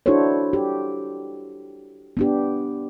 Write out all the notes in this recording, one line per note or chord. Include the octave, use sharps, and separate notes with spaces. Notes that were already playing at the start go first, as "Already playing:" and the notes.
D4 E4 F#4 A4 C5 C#5
G4
B3 D4 G4